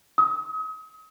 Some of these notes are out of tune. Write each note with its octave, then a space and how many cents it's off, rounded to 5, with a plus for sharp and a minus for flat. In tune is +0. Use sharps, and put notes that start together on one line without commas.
D#6 +40